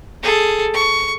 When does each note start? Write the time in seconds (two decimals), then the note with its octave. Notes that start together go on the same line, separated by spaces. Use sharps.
0.22 G#4 A4
0.73 C#6